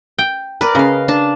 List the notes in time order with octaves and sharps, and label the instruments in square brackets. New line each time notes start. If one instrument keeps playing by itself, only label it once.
[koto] G5
[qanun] A#4 D5 [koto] B4
[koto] C#3 [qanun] D#5 F5
[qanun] D4 A5